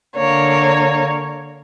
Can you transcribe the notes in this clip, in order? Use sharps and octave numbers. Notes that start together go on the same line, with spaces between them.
D3 A#3 C#5